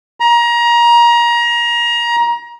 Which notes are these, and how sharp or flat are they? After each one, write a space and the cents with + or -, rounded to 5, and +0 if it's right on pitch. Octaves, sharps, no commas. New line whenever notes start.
A#5 +25